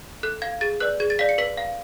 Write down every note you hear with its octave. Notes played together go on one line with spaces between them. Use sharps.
A4 F#6
F5 G#6
G#4 A6
B4 D5 F#6
G#4 G#6
A6
D5 F5 B6
C#7
B4 B6
F5